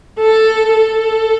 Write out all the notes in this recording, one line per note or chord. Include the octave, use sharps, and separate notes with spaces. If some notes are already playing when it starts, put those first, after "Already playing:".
A4
A4